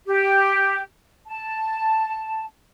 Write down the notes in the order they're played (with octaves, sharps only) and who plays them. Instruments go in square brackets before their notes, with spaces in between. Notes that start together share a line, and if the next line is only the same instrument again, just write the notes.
[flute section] G4
A5